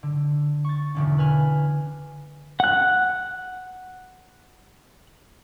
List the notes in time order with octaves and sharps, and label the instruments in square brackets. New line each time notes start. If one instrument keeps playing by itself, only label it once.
[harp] D3
C#6 A6
E1 D3 C#4
B4 G#5 F6
[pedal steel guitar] F#5 F#6